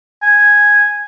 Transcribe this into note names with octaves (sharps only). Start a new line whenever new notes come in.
G#5